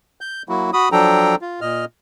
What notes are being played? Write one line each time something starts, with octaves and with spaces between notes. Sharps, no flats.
G6
F#3 A#3 E4 F#4
F#4 B5 D#6
F3 F#3 D4 A4 G5 A#5
F4
A#2 D#5 F6